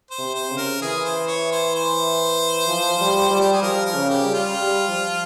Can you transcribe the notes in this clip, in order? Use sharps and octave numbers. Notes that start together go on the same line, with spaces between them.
C5
C3
C5
C#3
A#4
E3 G#4
C5
C#5
C5
C5
F3
G3
G3
G4
G#4
F3 A#4
A#4
C#3
G4
G3
F4
G3
F3